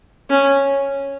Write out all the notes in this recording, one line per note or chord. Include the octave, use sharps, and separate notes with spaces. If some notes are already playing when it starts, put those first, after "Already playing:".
C#4